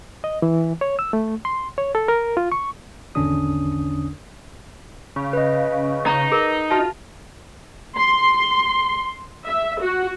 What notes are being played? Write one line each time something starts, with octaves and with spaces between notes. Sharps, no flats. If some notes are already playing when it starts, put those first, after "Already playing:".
D#5
E3
C#5
E6
A3
C6
C#5
A4
A#4
F4
C#6
G#1 E2 D3 C#4 D4 D#6
C#3
B4 D#5
D#4 A#5
G#4 A#4
F4 F#4 E5 A5
C6
E5
F#4